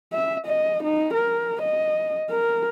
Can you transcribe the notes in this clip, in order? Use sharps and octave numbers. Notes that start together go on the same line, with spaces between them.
E5
D#5
D#4
A#4
D#5
A#4